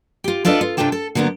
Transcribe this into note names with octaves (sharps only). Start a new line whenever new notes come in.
F4 G4
D4 F4 A4 B4 D5 D#5
F4
C3 D4 F4 A4 G5 A5
A4
D3 F3 F#3 A#3 B3